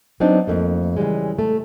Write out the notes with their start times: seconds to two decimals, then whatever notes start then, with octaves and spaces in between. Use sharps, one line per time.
0.20 F#3 B3 C4 D4 D#4
0.47 F2 A3 A#3
0.96 C#3 E3 G3 G#3
1.38 A3